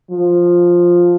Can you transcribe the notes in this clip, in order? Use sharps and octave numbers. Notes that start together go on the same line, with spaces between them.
F3